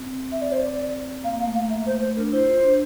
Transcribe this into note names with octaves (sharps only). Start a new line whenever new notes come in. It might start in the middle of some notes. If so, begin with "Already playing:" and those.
Already playing: C4
E5
D5
C5
D5
A#3 F5
F5
A3
F5
A#3 E5
A3 C5
A3 C5
D4 A#4
E4 C5
F4
D4